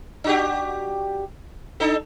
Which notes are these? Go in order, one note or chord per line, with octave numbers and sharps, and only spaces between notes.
D4 F#4 G4
D4 D#4 A4